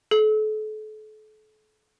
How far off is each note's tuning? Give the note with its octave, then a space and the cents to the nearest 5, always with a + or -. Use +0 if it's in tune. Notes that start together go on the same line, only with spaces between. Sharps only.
A4 -35